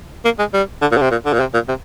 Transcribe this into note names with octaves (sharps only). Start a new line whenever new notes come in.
A#3
G#3
G3
D3
A#2
D3
C3
A#2
D3
A#2
C3
A#2
C3